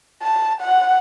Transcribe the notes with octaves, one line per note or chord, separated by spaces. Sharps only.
A5
F#5